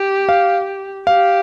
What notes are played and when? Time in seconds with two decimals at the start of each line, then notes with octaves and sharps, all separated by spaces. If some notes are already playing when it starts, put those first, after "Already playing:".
Already playing: G4
0.29 F5
1.07 G4 F5